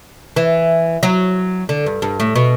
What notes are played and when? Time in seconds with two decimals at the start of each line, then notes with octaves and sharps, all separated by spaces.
0.36 E3
1.03 F#3
1.69 D3
1.86 G2
2.02 G2
2.20 A2
2.36 B2